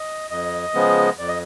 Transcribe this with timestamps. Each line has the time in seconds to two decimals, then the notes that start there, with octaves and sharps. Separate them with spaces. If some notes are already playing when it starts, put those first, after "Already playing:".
Already playing: D#5
0.30 F2 D#5
0.74 C#3 F3 G#3 B3
1.18 F2 D5
1.28 D#5